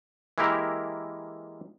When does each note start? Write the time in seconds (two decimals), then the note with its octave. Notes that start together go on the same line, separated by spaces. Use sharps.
0.38 E3 G#3 A#3 E4 G4 A#4